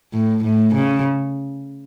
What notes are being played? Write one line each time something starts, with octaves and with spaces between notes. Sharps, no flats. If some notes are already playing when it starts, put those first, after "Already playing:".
A2
A2
C#3